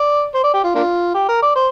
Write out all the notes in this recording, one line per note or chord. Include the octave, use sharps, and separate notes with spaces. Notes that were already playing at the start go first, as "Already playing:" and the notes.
Already playing: D5
C5
D5
G4
F4
A#3 D4 F4
G4
A#4
D5
C5